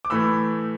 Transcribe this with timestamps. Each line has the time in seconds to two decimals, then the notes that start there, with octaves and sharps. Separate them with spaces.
0.05 D6
0.10 A2 E3 A3 B5 E6